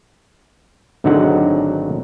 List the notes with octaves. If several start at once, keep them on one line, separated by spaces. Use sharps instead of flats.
G#1 D3 F#3 D#4 F#4 F#5